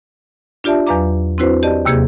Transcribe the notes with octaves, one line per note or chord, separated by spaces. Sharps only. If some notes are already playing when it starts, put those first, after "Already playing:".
D4 F4 G4 D5 E5 A5
E2 F#3 B4 F5 A#5 D6
C4 D4 E4 F#4 B4 C5
G4 D5 D#5 A5
D#2 C3 A#3 G4 G#4